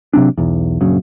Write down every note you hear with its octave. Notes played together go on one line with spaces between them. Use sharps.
C3 F#3 C4 D4
B1 E2
A#1 F#2 C#3